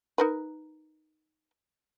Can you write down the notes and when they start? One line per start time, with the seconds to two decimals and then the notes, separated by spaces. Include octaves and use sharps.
0.18 D#4 A#4 B4